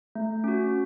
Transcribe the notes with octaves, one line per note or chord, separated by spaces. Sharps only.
A3
C#4 F#4